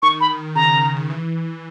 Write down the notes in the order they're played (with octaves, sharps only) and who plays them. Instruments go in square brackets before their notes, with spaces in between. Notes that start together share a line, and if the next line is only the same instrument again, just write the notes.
[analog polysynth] D#3 [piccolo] C#6
[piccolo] B5
[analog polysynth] C#3 [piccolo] A#5
[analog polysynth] D#3
C#3
E3